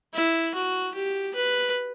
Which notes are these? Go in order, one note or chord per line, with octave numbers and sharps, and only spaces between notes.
E4
F#4
G4
B4